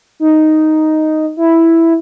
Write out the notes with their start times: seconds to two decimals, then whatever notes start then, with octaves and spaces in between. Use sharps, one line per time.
0.20 D#4
1.37 E4